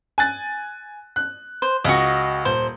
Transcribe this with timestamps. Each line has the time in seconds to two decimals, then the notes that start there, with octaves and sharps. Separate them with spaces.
0.18 G#5 F#6 A6
1.16 F#6
1.62 C5
1.84 C#2 F#4 D#5
2.45 D#1 C5